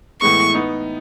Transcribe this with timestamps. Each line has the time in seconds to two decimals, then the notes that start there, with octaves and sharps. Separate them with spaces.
0.21 A2 E3 G#3 B3 C#6
0.55 B3 D#4